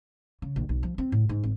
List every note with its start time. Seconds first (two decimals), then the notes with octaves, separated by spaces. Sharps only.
0.42 C#3
0.56 A#1
0.69 B1
0.83 F3
0.98 C4
1.12 A2
1.29 G#2
1.43 G#1